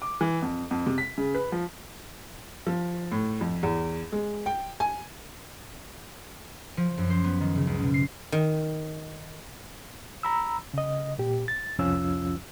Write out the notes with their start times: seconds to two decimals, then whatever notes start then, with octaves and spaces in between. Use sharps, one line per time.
0.02 D6
0.21 E3
0.42 F2
0.71 F2
0.86 C3
0.98 B6
1.18 C#3
1.35 B4
1.52 F3
2.67 F3
3.12 A2
3.41 F2
3.63 E2
4.12 G#3
4.46 G5
4.80 G#5
6.77 F3
6.98 F#2
7.10 C5
7.24 B3
7.40 D#3
7.55 C#3
7.67 C#2
7.80 B2
7.94 C7
8.32 D#3
10.23 A#5 B5 E6
10.74 C#3 D#5
11.19 A#2 G4
11.48 A6
11.79 C2 F2 F3 C#4 F4 E6